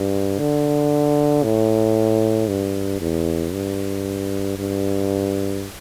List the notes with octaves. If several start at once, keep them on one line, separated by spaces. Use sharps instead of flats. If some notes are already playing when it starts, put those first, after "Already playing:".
Already playing: G2
D3
A2
G2
E2
G2
G2